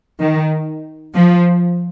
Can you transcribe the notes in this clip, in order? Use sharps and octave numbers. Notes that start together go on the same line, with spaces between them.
D#3
F3